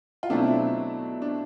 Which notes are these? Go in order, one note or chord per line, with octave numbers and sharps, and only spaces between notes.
F4
B2 F#3 A3 C4 D4 E4
D4